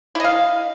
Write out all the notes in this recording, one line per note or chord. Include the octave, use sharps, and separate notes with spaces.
E4 D#5 F5